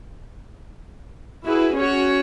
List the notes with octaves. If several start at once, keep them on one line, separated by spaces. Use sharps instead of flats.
E4 F#4 G#4 B4
C#4 F#4 C#5